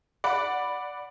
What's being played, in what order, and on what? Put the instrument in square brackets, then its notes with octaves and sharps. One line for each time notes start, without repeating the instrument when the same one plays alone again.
[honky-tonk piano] D5 F#5 B5